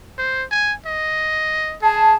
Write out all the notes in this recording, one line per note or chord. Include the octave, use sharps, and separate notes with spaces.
C5
G#5
D#5
G#4 A5